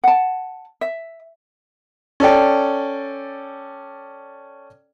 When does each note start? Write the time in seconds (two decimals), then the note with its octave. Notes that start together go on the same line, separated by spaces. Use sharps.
0.04 F#5 A5
0.81 E5
2.20 C#4 A4 D5 G5